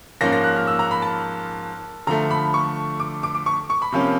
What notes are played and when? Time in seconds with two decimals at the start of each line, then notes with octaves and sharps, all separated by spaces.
0.21 G#2 F3 A#3 C#4 A#6
0.32 A#6
0.44 F#6
0.56 F6
0.67 E6
0.79 A#5
0.91 B5
1.02 A5
2.07 D3 F3 A3 A#5
2.31 B5
2.54 C#6
3.00 D6
3.23 D6
3.35 D6
3.46 C#6
3.70 C#6
3.82 B5
3.92 C3 F3 A#3 C#4